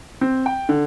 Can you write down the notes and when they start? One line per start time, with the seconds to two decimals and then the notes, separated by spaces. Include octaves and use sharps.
0.21 C4
0.46 G5
0.69 D3